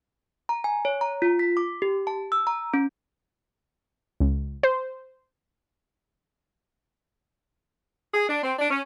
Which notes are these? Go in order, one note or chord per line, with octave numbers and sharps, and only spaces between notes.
A#5
G#5
C#5
A#5
F4
B6
D6
G4
A5
E6
A#5
C#4
C#2
C5
G#4
D4
C4
D4
C#4